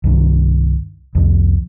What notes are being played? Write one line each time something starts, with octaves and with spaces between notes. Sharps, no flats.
C2 G2 D#3
C2 F2